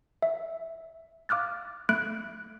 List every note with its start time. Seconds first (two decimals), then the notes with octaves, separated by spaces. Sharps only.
0.22 E5
1.29 F5 D6 F6 F#6 A6
1.89 A3 F#6 D7